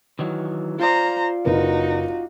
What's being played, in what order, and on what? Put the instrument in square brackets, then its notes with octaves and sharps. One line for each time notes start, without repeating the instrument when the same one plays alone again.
[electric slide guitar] D#3 E3 F#3
[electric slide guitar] F4 D5 [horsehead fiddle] C5 A#5
[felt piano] F#1 A#4 B4 [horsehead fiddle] D#4 F#4